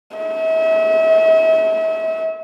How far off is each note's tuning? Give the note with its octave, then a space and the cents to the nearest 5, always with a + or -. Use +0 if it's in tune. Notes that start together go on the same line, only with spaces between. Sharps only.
E5 -40